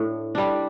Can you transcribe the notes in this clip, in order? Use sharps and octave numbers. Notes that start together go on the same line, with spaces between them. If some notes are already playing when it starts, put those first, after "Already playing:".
Already playing: A2 D4
G3 D4